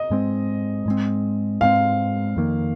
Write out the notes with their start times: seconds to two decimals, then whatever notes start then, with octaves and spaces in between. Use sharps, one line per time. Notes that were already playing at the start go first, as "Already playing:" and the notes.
Already playing: D#5
0.10 G#2 G#3 C4
0.86 G#2 G#3 C4
1.61 G#2 G#3 C4 F5
2.36 F2 D#3 A#3